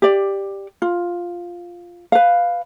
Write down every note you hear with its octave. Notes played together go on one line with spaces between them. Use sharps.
G4 D5
F4
B4 F5